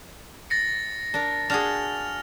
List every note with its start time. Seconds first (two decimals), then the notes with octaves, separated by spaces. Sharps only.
0.50 A6 A#6 C#7
1.14 D4 A#4
1.50 D4 F#4 G#4 F6 A#6 F7